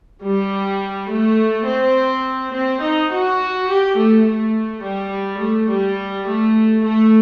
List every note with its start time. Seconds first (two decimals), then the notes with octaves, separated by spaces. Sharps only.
0.23 G3
1.09 A3
1.66 C4
2.53 C4
2.81 D#4
3.11 F#4
3.68 G4
3.97 A3
4.25 A3
4.83 G3
5.40 A3
5.68 G3
6.26 A3
6.84 A3